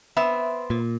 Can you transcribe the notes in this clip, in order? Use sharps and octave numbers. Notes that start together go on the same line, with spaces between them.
B3 C4 E5
A#2